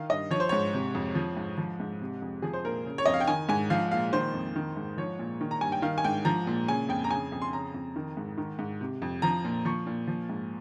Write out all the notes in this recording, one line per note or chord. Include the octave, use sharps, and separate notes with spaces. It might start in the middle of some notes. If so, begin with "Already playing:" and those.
Already playing: D#3 F5
G2 D#5
F3 C#5
C5
G#2 C#5
C3
F2
F3
G#2
F3
G#2
C3
F2
F3 G#4
C5
A#2 A#4
C#3
C#5
F2 D#5
F5
G5
D#3 G#5
G#2 G#5
F3 F5
A#2 F5
D#3 C5
F2
D#3
G#2
F3 C#5
A#2
D#3
A#5
G2 G#5
G5
D#3 F5
G#5
G#2 G5
F3 A#5
A#2
C#3 G#5
F2 G5
A#5
C#3 G#5
F2
C6
C#3 A#5
F2
D#3
G#2
D#3
G#2
C3
F2
F3 A#5
A#2
F3 C#6
A#2
F3
G#2